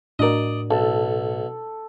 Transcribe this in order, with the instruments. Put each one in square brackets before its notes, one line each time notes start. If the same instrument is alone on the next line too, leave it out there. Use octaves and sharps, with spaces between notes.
[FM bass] A2 [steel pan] D4 F#4 A#4 [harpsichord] D5 D#5
[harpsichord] B1 [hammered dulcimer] A4 [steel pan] A5